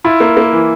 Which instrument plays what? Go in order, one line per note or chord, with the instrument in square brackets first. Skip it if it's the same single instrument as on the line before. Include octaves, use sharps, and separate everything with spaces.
[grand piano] E4 [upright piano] F4
[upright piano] A#3
A#3
E3